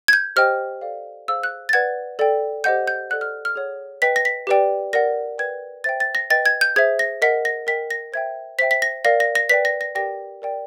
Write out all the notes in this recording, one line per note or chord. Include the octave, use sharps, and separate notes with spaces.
G#6
G6
G4 C5 D#5 G5 F6
A4 D5 F5
G#4 C5 F5 E6
F#6
A6
B4 D5 F#5 G#6
A4 D5 G5
G4 C5 D#5 F#5 G6
G6
A4 D5 F#5 F#6
F6
F6
G#4 C#5 F#5
B4 D#5 G5 B6
A#6
B6
G4 B4 D5 G5
A#4 D5 F#5 A#6
B4 D5 G5 G#6
C5 E5 G5 A6
A6
A#6
B4 D#5 G5 A6
G#6
G6
G#4 C5 E5 G#6
A#6
A#4 D#5 F#5 B6
A#6
A#4 D#5 G5 B6
A#6
C5 E5 G5 G#6
C5 E5 G5 B6
B6
A#6
A#4 D5 F5 A#6
A#6
A#6
B4 D5 G5 B6
A#6
A#6
G4 A#4 D5 G5 A#6
A#4 D5 G5